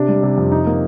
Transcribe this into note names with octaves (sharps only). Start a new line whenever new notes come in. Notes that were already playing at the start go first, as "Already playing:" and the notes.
Already playing: C3 D4
G3
C3
F2
D#4
A#3